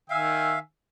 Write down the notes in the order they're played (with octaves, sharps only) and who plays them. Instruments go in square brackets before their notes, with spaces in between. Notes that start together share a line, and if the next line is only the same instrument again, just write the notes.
[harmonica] D#3 G#5 E6 [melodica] E5 F5